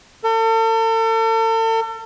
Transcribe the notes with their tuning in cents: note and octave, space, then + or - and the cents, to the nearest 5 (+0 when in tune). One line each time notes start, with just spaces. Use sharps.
A4 +40